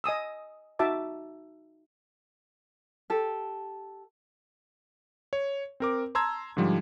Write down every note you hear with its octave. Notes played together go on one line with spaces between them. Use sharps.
D#5 G#5 D#6 E6
D#4 F#4 E5 A5 D6
G4 A4
C#5
C4 A#4 D6
A5 A#5 C6 E6 G#6
G#2 D3 F3 G3